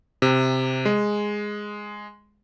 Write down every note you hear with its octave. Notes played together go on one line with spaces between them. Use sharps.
C3
G#3